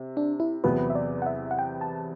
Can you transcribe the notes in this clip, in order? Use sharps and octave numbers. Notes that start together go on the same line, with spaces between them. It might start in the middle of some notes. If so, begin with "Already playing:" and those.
Already playing: C3
D4
E4
E2 C3 F#3 B3 B4
E5
D5
F#5
E5
F#5
G5
A5